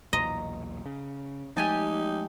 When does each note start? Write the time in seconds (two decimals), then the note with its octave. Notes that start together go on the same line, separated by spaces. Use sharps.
0.13 B1 E2 A#2 D#5 A#5
0.86 C#3
1.57 F3 G#3 A3 D#4 G4 G#5 A5